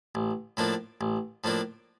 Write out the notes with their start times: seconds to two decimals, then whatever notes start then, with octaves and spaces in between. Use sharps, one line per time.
0.15 A1
0.57 A2 F3 A#3 D4
1.01 A1
1.44 A2 F3 A#3 D4